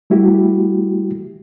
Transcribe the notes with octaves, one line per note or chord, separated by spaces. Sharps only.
G3 A3 E4 F#4 G4